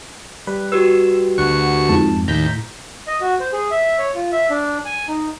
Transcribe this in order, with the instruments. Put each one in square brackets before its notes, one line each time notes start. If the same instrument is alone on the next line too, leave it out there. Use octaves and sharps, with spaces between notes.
[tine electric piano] G3 [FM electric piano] B4
[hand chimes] F#4 G4 B4 [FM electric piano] E6
[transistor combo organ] D2 C#6 [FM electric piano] F#5
[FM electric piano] F2 G#2 [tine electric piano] A5
[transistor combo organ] D#2 [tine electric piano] A2 [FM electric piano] A#5 G6 B6
[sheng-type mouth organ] D#5
F#4
C5
G#4
E5
C#5
F4
E5
D4
G#5
D#4